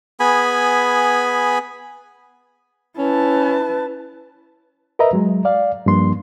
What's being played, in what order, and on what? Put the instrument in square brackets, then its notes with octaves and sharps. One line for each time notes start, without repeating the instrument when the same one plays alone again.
[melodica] B3 G#4 G#5 B5
[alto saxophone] C#4 [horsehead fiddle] E4 A5 [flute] B4
[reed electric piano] A#4 B4 D#5 E5 A#5
F#3 G#3
D5 F5
G2 F3 A#3 D4 C6